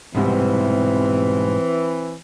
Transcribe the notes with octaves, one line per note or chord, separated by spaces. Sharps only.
C2 G#2 B2 E3 G3 B3 C4